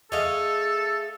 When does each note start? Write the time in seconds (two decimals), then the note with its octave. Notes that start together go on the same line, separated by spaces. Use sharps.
0.12 A3 G#4 A4 C#5 D#5 F5